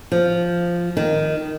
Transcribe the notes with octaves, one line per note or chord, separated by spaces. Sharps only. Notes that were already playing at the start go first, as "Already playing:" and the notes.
F3
D#3